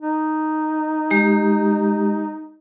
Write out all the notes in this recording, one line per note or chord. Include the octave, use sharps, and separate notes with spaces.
D#4
G#3 G4